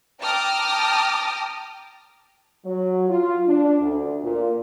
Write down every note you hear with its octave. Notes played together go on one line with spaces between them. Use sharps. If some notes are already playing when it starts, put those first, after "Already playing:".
G5 A5 A#5 D6 D#6 F6
F#3
F4
D4
D2
A#2